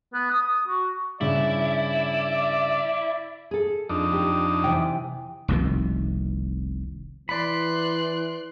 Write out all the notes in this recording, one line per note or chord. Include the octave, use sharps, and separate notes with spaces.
B3
D#6
F#4
G2 C#3 E4 D5
G#4 A4
F2 D4 D#4
G4
C3 E3 G5
F1 C2 B2 D#3
E3 D5 B5 C6 F#6